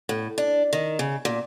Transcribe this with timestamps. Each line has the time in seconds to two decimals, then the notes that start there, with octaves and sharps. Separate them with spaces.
0.09 A2
0.38 D4
0.73 D#3
0.99 C#3
1.25 A#2